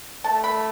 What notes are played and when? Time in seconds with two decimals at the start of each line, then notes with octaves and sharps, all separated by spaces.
0.24 A3 A5
0.44 B5